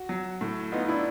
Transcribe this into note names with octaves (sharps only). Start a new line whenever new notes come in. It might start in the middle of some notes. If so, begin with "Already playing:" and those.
Already playing: F#4
F#3
A2
B3 D#4 F4
D4 E4